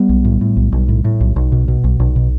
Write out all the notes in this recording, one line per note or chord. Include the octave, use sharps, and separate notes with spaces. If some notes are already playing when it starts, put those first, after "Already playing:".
Already playing: G3 B3
B1
A2
A2
B1
B1
A2
A2
B1
B1
B2
B2
B1
B1
B2